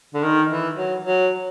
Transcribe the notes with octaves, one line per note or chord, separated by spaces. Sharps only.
D3
D#3
E3
F#3
F#3